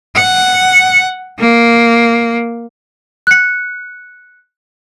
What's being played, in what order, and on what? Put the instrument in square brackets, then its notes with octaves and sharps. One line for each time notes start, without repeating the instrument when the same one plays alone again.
[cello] F#5
A#3
[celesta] F#6 C#7